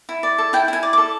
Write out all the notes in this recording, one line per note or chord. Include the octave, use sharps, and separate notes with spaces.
E4
D5
A4
E4 G5
E4 G#5
D5
D6
A4